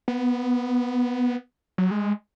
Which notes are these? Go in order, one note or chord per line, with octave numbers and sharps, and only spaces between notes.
B3
F#3
G#3